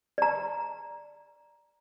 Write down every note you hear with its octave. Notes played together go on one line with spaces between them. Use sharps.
D5 A#5